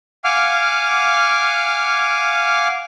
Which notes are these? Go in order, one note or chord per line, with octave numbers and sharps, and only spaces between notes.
F5 F#5 G#5 D6 F6